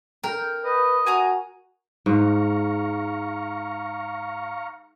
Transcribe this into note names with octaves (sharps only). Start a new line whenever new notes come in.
A#4 G5
B4 D#5
F#4 G#5 A#5 D#6
G#2 F5 A#5 C#6